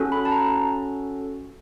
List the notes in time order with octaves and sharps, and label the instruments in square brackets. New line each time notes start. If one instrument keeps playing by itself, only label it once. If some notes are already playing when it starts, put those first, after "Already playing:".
Already playing: [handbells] C#4 F#4 A4
B5
A5
A#5